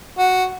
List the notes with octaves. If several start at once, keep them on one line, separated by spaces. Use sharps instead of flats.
F#4